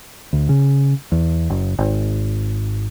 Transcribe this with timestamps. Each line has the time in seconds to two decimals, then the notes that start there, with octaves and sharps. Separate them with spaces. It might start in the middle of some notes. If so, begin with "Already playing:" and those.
0.33 D2
0.49 C#3
1.12 E2
1.50 F#1
1.78 G#1